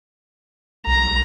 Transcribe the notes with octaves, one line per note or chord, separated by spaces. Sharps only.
B1 A#5